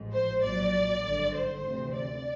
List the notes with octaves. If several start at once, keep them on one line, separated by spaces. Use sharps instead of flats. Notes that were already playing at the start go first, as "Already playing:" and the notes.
Already playing: A1 G#2 F3
C5
A#1 A#2 F#3 D5
G#1 G2 D3
C5
D2 C3 E3
D5